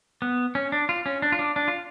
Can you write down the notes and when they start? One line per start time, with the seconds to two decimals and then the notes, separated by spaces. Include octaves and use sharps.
0.22 B3
0.55 C#4
0.72 D4
0.89 F4
1.06 C#4
1.22 D4
1.32 F4
1.39 D4
1.56 D4
1.68 F4